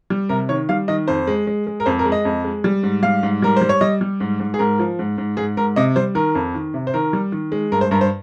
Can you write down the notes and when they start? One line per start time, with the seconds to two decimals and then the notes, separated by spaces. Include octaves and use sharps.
0.10 G3
0.29 C3 A#4
0.49 D#3 C#5
0.69 G3 F5
0.88 D#3 D#5
1.07 F2 C5
1.27 G#3
1.47 G#3
1.67 G#3
1.80 A#4
1.86 F2 C5
1.99 A#4
2.05 G#3
2.12 D#5
2.25 F2
2.44 G#3
2.64 G3
2.83 G#2
3.03 G3 F5
3.23 G#2
3.42 G3 A#4
3.56 C5
3.62 G3
3.69 C#5
3.81 G3 D#5
4.01 G3
4.20 G#2
4.40 G#2
4.54 G#4
4.59 G#2 A#4
4.79 F3
4.99 G#2
5.18 G#2
5.37 G#2 G#4
5.57 G#2 A#4
5.76 C3 D#5
5.96 G3 C5
6.15 D#3 A#4
6.35 F2
6.54 D#3
6.74 C3
6.87 C5
6.94 D#3 A#4
7.13 G3
7.32 D#3
7.52 G#3
7.72 G2 A#4
7.81 C5
7.91 G2 A#4
8.01 C5